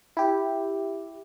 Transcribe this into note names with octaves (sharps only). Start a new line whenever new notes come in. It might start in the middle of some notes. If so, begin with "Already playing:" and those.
E4 G4